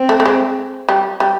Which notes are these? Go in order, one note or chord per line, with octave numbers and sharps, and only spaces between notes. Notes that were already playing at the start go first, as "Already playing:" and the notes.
Already playing: C4
A3
A3
G#3
G3
G3